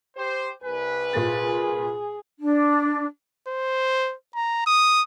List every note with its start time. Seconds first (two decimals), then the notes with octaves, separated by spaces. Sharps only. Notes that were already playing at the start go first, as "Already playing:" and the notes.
0.17 G4 C5
0.63 C2 B4 G#5
1.13 A#2 A#3 G#4 A6
2.40 D4
3.48 C5
4.35 A#5
4.66 D#6